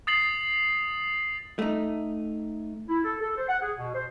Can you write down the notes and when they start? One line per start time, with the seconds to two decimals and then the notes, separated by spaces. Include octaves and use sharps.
0.07 D#6 A6 C7 F#7
1.59 A3 D#4
2.89 E4
3.04 A4
3.19 A4
3.36 C5
3.49 F#5
3.62 G#4
3.78 B2
3.94 C5